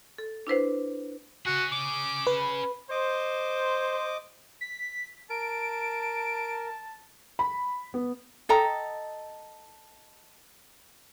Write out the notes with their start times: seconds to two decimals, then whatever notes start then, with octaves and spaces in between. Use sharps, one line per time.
0.18 A4
0.47 D4 E4 B4 C5
1.46 C#4 F#4 G#4
1.72 D6
2.27 B4
2.91 C5 D#5 D6
4.61 B6
5.30 A#4 A5 D7
7.39 B5
7.94 B3
8.49 A4 D#5 G5 A#5